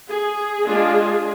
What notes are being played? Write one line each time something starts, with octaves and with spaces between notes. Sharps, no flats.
G#4
G#3 D4 F4